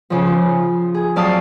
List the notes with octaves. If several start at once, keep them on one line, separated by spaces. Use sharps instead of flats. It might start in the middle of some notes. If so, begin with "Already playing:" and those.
C#3 F3
C6
G#4
F#3 C4 D5 F5 A5 D#6